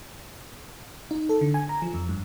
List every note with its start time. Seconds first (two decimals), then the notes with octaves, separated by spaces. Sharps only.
1.11 D#4
1.29 A4
1.41 D3
1.54 G#5
1.69 A#5
1.82 F3
1.94 F2
2.09 G2